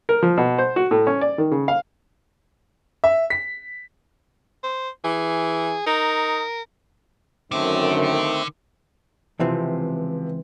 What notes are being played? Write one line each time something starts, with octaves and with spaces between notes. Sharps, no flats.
A#4
F3
B2
C5
F#4
A2
C#4
D5
D#3
C#3
F5
E5
B6
C5
E3 G#4
D#4 A#4
F#2 D3 D#3 A3 C4
C#2 C3 E3 F3 C4